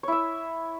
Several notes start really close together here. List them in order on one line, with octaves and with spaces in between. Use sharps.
C#5 E4 E5